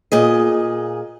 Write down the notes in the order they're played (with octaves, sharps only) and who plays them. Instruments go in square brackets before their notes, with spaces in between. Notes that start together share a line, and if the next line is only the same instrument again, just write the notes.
[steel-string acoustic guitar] A#2 G#4 D#5